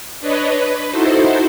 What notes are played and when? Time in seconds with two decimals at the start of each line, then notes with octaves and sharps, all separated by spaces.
0.21 D4 B4 C#5 D#5
0.54 B4
0.90 D#4 E4 F#4 A4 C5